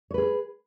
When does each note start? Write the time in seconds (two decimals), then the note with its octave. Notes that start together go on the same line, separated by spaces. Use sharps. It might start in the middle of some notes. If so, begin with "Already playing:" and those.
0.11 C#5
0.14 B4
0.18 G#4